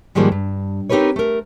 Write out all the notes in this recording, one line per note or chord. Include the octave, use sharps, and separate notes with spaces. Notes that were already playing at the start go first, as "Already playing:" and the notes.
G#2 D#3 F3 G3 G#3 A#3
G2
C4 D#4 G4 A#4 B4 C#5
A3 A#4